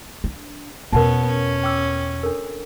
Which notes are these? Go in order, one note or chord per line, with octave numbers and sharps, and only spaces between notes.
D4
E2 B2 B3 C#4 A#4 F#5 A5
C#4
G5 D6 E6
D4 A4 A#4